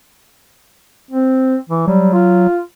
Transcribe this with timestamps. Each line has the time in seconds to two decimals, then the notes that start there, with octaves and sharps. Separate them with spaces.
1.11 C4
1.69 E3
1.88 F#3 G3
2.13 F4